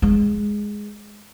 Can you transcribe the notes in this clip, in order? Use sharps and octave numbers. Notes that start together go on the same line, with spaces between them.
G#3